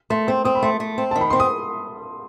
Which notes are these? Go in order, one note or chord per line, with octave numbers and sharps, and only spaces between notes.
A3 C6
C4 C6
C4 D#6
B5
A3 C6
A3
C4
D#3 A5
B5
C4 C6
D#6